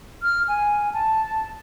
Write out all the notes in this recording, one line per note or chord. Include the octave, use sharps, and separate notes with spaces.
F6
G#5
A5